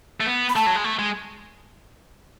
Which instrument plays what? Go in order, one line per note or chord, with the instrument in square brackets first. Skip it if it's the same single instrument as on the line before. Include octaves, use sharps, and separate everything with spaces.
[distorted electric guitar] A3
B3
[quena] B5
[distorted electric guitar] A3 [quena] A5
[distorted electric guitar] F#3
G#3
A3
G#3